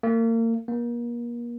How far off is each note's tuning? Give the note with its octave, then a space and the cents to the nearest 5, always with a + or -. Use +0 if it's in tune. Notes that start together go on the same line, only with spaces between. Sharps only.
A#3 -35
A#3 +35